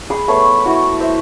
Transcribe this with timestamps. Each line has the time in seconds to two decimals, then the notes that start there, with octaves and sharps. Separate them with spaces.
0.10 G#4 B5
0.28 A3 B3 B4 C#5
0.66 E4 F#4
1.00 C5 E5